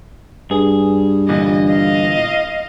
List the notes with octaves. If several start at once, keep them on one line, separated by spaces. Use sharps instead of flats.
G2 G#4
A#2 D3 E3 D#5
D#5 F5